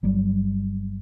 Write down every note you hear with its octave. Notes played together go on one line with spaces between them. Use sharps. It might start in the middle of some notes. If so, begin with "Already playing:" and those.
G1 F#3 G3